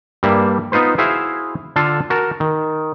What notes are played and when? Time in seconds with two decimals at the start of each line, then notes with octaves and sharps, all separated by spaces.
0.23 G2 G3 A#3 E5
0.72 B3 D#4 F4 B4 C5
0.98 E4 F#4 G#4 C5 E5 F5
1.76 D3 F4 A4 F5 A5
2.10 F#4 A#4 A5
2.40 D#3